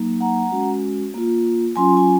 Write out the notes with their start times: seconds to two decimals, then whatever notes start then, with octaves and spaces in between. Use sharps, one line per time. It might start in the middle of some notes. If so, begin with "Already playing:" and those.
Already playing: F#3 A#3 D#4
0.20 F#5 A#5
0.52 G#3 C#4 F#4
1.14 A#3 F4
1.76 F#3 C#4 F4 G#5 C6
1.97 G#5